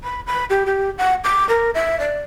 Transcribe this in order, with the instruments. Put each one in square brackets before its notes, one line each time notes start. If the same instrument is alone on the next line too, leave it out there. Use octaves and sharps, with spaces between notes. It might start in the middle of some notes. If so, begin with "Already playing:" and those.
[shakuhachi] B5
B5
G4
G4
F#5
D6
A#4
E5
D5